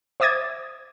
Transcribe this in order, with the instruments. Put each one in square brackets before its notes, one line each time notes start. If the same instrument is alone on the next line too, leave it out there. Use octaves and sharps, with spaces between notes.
[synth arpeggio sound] C5 E5 D6 D#6 G#6 A6